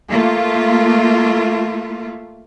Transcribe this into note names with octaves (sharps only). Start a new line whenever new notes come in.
A3 A#3 F4